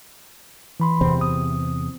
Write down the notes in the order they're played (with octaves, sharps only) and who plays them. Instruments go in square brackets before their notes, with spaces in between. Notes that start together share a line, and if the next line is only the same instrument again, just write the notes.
[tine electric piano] E3 B5 C6
[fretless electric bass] E2 C3 C4
[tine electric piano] D#6